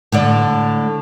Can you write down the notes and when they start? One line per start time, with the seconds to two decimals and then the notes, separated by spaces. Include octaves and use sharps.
0.12 A2 D3 D5